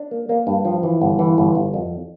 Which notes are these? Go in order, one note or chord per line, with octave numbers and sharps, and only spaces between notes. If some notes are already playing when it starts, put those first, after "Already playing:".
Already playing: D4
A#3
A#3
G2
F3
E3
G1
E3
G1
G1
F2